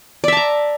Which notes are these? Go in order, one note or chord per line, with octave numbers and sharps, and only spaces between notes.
D5 E5 A5 A#5